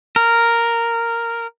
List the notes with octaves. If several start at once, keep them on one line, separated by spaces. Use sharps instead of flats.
A#4